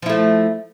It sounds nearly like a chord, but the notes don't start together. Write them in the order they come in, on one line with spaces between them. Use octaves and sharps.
F3 E4 A3